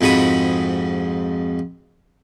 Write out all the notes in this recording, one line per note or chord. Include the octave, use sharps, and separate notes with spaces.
F2 G#2 F#4 B5 D#6